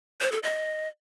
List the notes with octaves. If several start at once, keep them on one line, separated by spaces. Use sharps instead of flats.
C5
A4
D#5